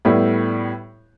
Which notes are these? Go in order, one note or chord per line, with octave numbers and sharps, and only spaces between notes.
A2 G3 B3 E4